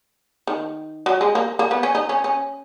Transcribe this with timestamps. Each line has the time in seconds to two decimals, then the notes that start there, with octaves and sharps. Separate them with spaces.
0.47 D#3
1.06 F#3
1.21 G#3
1.35 A#3
1.59 A#3
1.71 B3
1.83 C#4
1.95 D#4
2.09 C#4
2.24 C#4